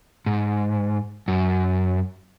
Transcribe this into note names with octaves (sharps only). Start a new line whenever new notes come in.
G#2
F#2